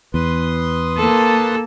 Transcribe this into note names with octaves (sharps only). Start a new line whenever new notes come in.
E2 B4 C6 D#6
A#3 A4 A5